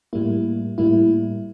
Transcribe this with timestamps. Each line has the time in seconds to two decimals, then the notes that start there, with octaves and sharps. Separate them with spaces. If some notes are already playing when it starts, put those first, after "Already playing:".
0.13 A2 G3 A#3 E4
0.78 A2 G3 A#3 E4